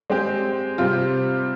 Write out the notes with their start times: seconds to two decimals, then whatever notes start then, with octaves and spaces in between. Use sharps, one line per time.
0.10 G#3 C4 G4
0.78 C3 G3 C4 F4